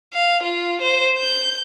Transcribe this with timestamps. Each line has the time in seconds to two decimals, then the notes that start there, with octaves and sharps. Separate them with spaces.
0.13 F5
0.43 F4
0.81 C5
1.18 G6